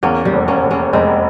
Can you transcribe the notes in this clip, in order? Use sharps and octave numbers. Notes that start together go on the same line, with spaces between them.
E2 A#3 C#4
G3 A#3
F1
A#3 C#4
F1
A#3 C#4
F1 G#3 C4